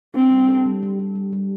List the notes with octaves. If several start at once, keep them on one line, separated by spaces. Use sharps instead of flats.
C4 D4
G3
A4
G3
G3
G3
G3
G3